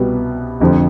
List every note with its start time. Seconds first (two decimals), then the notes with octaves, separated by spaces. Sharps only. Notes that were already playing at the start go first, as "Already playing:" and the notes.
Already playing: C2 B2 G3 B3
0.60 F1 F2 D3 F3